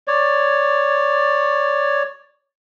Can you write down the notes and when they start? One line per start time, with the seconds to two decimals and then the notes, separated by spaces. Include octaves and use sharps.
0.07 C#5 D5